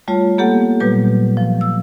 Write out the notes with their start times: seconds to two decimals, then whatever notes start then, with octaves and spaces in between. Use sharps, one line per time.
0.08 G3 A3 F4 C#5
0.38 A#3 B3 G4 A4 F#5
0.80 A#2 F#3 G3 B4 G6
1.37 F3
1.61 E6